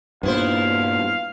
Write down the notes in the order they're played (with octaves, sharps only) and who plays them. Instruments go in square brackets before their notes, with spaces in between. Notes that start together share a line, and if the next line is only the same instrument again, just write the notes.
[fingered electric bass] G2 A#2 [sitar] B3 E4 C5 [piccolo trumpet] F5